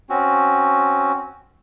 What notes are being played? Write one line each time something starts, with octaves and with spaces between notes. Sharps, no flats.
C4 C#4 F#4